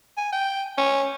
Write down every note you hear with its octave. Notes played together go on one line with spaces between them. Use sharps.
G#5
G5
C#4